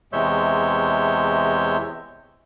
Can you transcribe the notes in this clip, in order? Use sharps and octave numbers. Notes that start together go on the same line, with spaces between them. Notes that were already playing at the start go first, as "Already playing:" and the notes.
E2 C3 G#3 C#5 E5 G6